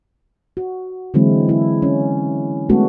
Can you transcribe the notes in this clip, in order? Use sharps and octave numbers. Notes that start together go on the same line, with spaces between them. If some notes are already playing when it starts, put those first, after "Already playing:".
F#4
D3 E3 F#3 G#3 C4 E4
E4
C#4
G#3 A3 B3 C#4 F#4 A4